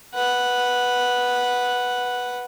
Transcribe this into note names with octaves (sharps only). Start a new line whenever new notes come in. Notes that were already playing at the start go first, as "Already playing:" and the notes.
B4 F#5